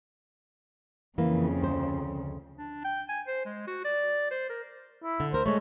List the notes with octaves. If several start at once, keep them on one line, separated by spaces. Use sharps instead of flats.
F2 C#3 E3 A#3
D2 C5
D4
G5
G#5
C5
G#3
F#4
D5
C5
A#4
E4
D3
D2 A#4 C5
G#3 A3 C#5